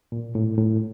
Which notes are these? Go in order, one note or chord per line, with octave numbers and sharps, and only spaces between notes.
A#2
A2
A2